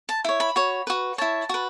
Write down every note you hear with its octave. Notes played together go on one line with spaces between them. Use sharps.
A5
E4 C#5
B5
F#4 C#5
F#4 B4
E4 C#5 A5
F#4 B4